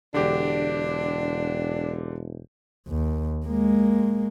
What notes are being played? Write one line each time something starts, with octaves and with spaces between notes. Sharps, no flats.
E1 D3 D4 G4
D#2
G#3 A#3